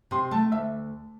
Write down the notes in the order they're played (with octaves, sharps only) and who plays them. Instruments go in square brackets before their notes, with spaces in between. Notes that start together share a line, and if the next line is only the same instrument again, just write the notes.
[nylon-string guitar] C3 [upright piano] C6
[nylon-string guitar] A3 [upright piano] A5
[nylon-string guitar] D2 [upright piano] E5